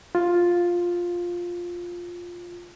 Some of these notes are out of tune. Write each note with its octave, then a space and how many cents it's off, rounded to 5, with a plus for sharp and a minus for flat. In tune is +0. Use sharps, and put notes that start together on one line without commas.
F4 +5